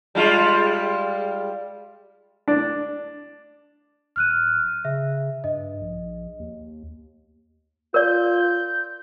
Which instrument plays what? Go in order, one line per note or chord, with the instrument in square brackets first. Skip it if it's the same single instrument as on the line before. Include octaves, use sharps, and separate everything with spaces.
[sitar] G3 G#3 F4
[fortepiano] D4
[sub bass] D1 [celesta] F6 F#6 D#7
[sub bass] C#3 [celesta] E5
[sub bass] G2 [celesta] D#5
[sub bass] A#1
D#2
[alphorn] F4 [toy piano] A#4 D5 [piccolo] G6